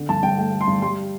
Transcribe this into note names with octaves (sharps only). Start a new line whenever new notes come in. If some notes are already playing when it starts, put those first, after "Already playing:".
Already playing: D3
G2 A5
G2 G5
A3 G5
A3
C6
G2
G3 C6